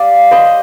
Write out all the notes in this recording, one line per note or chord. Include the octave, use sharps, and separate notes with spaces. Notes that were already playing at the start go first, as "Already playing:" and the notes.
Already playing: G3 D5 F5
C5 D#5